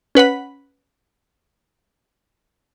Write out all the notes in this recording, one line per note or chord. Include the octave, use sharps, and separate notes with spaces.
C#4 B4 F#5 B5